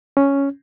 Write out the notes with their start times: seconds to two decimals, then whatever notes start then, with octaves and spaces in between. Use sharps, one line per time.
0.17 C#4